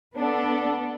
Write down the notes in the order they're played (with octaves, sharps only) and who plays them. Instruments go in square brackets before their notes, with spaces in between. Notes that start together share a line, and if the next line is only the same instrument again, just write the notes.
[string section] B3 D4 A4